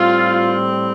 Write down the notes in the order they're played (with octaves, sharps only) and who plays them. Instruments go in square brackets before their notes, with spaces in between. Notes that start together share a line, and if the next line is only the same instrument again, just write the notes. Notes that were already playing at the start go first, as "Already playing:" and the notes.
Already playing: [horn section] A2 G3 C4 F4